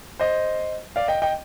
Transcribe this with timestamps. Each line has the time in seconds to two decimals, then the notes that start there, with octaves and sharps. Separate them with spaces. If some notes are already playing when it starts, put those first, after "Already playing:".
0.20 C5 D#5
0.96 D5 F5
1.08 D#5 G5
1.22 D#5 G5